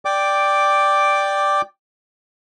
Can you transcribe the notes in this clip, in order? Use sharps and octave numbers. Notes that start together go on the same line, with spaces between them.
D5 G5 D6